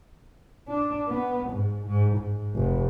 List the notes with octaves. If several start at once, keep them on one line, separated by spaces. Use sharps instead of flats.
D4
B3
G#2
G#2
G#2
F1